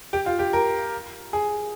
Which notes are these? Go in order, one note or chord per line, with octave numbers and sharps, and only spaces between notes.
G4
F4
G4
A#4
G#4